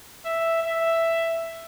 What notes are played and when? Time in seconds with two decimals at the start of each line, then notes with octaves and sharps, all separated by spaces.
0.25 E5
0.63 E5